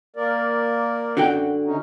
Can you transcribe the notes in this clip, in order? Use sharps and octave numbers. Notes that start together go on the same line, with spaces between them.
A#3 A#4 D5
F#2 D3 F#4 G5
C3 C#4 D#4